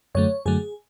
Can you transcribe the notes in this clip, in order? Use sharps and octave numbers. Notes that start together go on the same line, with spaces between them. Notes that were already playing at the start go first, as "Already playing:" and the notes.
F#2 D3 F#3 A3 C#5
F#2 D3 F#3 A3 G#4